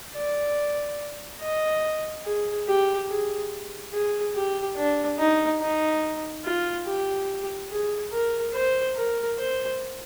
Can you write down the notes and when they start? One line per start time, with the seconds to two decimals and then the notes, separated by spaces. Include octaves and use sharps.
0.15 D5
1.41 D#5
2.25 G#4
2.67 G4
3.10 G#4
3.93 G#4
4.35 G4
4.77 D4
5.18 D#4
5.60 D#4
6.45 F4
6.86 G4
7.71 G#4
8.12 A#4
8.54 C5
8.96 A#4
9.38 C5